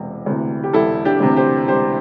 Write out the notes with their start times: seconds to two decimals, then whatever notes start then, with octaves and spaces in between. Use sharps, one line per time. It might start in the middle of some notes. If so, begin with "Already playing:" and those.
Already playing: E1 C3 E3
0.26 D2 C3 E3
0.63 G4
0.73 E1 E4 A4
1.05 D4 G4
1.20 D2 C3 E3
1.36 G4 C5
1.68 E1 G4 C5